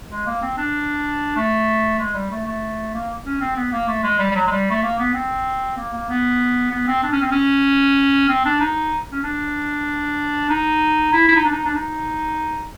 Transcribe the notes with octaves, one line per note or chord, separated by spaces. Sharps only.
G#3
A#3
C4
D4
A3
G#3
G3
A3
A3
A#3
C#4
C4
B3
A#3
A3
G#3
G3
G3
F#3
G#3
G3
A3
A#3
B3
C4
A#3
A#3
B3
B3
C4
D4
C#4
C4
C#4
C4
D4
D#4
C#4
D4
D#4
E4
E4
D#4
D4
D#4
D4
D#4